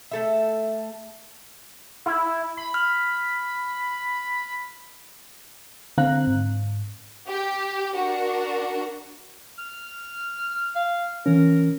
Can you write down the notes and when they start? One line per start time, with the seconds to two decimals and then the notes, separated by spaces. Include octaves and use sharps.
0.11 A3 A4 E5
2.06 E4
2.57 B5
2.74 F6
5.97 D3 C4 F5 A#5 F#6
6.27 G#2
7.28 G4
7.94 D4 F#4 A#4
9.58 F6
10.75 F5
11.26 E3 C#4 A#4